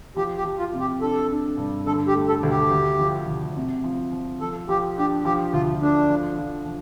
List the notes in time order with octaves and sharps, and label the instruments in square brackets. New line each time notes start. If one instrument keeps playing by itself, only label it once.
[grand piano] F3 [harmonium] G4
[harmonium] G4
[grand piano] F3
[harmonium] F4
[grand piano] C3
[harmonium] G4
[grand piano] D4 [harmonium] A4
[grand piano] D4
G2
[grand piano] D3 [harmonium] A4
[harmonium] G4
[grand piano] A3
[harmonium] A4
[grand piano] D2
[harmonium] G4
[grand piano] D2
F3
D2
C3
F3
F3
[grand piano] F3 [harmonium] A4
[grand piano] F3 [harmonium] G4
[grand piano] D4 [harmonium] G4
[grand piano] F3 [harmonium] G4
[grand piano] D2 [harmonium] F4
[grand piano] D3 [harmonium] D4
[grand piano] F3
F3
F3